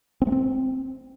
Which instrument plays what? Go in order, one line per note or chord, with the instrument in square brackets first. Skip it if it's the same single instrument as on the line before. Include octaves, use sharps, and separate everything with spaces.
[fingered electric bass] C4
A3
C4